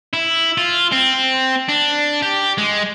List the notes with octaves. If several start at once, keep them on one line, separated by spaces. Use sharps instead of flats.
E4
F4
C4
D4
G4
G#3